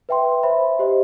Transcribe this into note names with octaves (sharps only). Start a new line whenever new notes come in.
B4 E5 G5 C6
C5 E5 B5
G4 C5 D#5